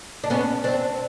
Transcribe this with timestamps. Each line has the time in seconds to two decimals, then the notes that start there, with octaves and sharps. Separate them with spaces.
0.24 D4
0.30 B3 C#4
0.64 C4 D4